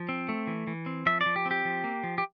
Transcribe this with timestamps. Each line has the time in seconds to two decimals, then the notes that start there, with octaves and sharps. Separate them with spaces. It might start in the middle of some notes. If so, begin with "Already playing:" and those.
Already playing: F3
0.09 C4
0.29 A3
0.47 E3
0.67 E3
0.86 C4
1.06 F3 E5
1.21 D5
1.26 F3
1.36 G4
1.46 C4
1.51 G4
1.65 F3
1.84 A#3
2.04 F3
2.18 G4